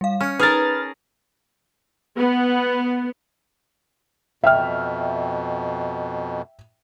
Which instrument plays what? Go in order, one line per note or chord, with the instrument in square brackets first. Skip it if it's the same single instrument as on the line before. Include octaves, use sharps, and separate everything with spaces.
[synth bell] G3 F5
[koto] C#4 [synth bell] F6 C#7
[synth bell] D#4 [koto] G#4 A#4 [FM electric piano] B4 F6 A6
[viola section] B3
[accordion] F2 B2 [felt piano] E5 G5 F6